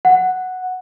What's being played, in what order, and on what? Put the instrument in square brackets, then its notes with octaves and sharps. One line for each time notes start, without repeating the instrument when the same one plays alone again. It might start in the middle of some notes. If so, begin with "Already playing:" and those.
[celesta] F#5